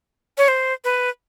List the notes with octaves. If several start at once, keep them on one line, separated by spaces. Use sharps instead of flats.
C#5
C5
B4